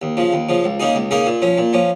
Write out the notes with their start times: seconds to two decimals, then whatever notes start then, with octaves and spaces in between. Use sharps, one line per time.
0.02 D#2
0.17 C#3 F3
0.33 D#2
0.49 C#3 F3
0.64 C#2
0.80 C#3 A#3 D#4 G#4
0.95 C#2
1.11 C#3 A#3 D#4 G#4
1.26 A#2
1.42 F3 C#4
1.58 A#2
1.73 F3 C#4